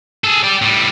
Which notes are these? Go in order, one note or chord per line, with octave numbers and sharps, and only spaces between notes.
G#4 A4
G4 D5
A2 G3